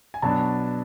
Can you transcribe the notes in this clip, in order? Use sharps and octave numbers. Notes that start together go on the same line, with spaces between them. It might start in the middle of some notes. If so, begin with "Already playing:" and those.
G#5
B2 F#3 B3 D4 A5